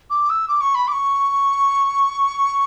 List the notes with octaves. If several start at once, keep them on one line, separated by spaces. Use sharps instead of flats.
D6
E6
D6
C#6
B5
D6
C#6